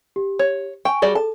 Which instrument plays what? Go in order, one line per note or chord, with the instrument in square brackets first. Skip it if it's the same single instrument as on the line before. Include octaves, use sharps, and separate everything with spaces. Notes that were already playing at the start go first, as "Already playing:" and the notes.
[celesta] G4
[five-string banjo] C#5
[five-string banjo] G5 [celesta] G#5 C#6
[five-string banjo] G3 F#4 D5 [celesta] G#4 G7
[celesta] A4 [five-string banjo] A5